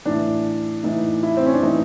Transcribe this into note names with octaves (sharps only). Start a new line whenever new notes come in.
A2 E3 D4
A2 E3 D#4
E4
C4
C#4
D4
A2 E3 D#4